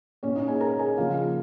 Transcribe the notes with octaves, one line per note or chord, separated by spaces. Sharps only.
A#2 A#3 C#4 C#5
D#4 D#5
G#4 G#5
A#4 A#5
G#4 G#5
C#3 F3 A#3 F4 F5